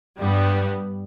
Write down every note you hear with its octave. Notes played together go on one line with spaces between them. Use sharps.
G2 G3 B3